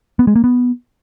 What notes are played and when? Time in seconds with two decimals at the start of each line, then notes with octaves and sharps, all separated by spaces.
0.19 B3
0.27 G#3
0.36 A#3
0.44 B3